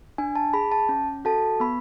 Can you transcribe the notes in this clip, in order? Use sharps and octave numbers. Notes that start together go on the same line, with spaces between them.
D4 G#5
A5
G#4 B5
A5
C#4
F#4 A4 A5
B3 B5